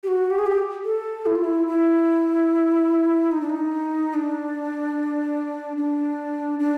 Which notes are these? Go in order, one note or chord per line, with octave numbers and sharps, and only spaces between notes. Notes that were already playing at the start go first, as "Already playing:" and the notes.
G4
F#4
G4
G#4
G4
A4
E4
F4
E4
E4
D#4
D4
D#4
D4
D4
D4